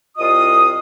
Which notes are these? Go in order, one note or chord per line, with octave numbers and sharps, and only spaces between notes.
C2 F4 D#5 D#6